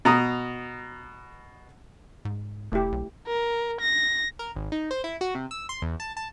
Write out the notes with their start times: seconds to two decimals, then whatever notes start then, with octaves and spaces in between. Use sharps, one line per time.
0.05 B2 A#5 D#6
2.25 G#2
2.72 E1 A3 E4 G4
2.92 B1
3.27 A#4
3.81 A#6
4.39 A#4
4.56 G#1
4.72 D#4
4.91 C5
5.04 E4
5.21 F#4
5.35 C3
5.51 E6
5.69 C6
5.82 E2
6.00 A5
6.17 A5